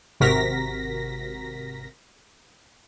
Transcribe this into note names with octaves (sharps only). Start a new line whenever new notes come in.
G#1 C3 F#4 A#4 A#6 B6